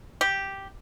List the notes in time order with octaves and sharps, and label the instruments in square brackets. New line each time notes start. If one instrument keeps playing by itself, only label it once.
[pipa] G4